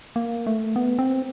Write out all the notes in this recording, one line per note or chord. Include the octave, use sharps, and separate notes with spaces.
A#3
A3
B3
C4